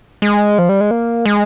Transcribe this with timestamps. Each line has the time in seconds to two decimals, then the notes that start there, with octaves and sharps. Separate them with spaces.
0.22 G#3
0.58 F3
0.69 G3
0.81 G#3
0.91 A#3
1.26 G#3